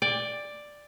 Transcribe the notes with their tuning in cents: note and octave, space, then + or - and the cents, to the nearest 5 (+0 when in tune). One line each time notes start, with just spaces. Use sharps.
D5 +5 G5 +45